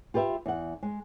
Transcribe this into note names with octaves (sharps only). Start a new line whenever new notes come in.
F4 G4 B4 D#5 E5
E2 F#5
G#3